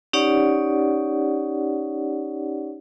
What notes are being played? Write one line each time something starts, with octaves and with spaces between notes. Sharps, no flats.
C#4 D#4 G4 C#5 D5 F#5